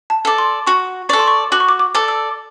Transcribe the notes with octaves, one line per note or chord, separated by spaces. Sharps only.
A5
A4 D5
C6
F#4 C#6
A4 D5 C#6
C6
C#6
F#4 D6
C#6
D6
D6
A4 D5
E6